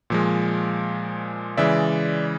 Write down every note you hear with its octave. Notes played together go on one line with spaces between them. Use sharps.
A#2 F3 G#3
C#3 E3 G#3 D5 E5